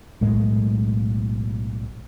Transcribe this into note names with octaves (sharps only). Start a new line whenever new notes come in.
B1 A2 G#3 A#3